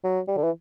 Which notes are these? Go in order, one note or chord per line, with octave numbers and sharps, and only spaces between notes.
F#3
G3
D3
E3